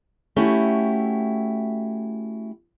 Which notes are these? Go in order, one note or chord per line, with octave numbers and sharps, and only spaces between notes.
A3 C#4 E4 F#4 G4